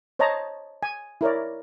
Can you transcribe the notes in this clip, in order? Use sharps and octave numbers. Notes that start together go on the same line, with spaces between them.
C5 C#5 D#5 A5 A#5
G#5
E4 A#4 C#5 D5